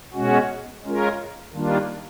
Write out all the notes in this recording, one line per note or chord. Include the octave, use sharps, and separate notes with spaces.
B2 G#3 C#4 F#4
G#3 C#4 F4 A#4
D#3 G3 A#3 D4 F4